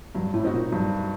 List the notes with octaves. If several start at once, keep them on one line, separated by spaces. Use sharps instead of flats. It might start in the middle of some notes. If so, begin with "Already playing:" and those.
G2 F#3
A2
C4 D#4 F#4
A#2
G2 F#3